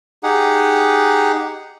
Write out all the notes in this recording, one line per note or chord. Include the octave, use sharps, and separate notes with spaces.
D#4 G4 G#4 F#5